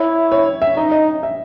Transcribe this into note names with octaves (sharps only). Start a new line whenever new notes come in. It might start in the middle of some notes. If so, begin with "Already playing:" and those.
Already playing: E4 C#5
C#5
E5
D#4 D#5
D#5
E5